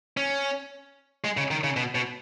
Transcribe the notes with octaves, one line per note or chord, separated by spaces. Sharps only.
C#4
G#3
C#3
D#3
C#3
B2
B2